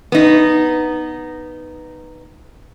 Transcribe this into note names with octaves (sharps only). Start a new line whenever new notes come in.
B3 D#4